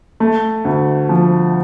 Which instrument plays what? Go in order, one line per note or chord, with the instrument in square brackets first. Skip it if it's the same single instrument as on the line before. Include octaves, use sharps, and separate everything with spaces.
[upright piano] A3
D2
F3